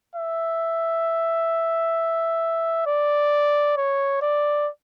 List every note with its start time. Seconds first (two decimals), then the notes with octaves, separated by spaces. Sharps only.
0.16 E5
2.87 D5
3.77 C#5
4.22 D5